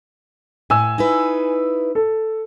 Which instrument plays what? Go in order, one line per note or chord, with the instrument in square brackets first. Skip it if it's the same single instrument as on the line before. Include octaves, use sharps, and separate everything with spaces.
[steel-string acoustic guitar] A2 [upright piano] G#5 E6
[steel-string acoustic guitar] D#4 E4 B4
[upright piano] A4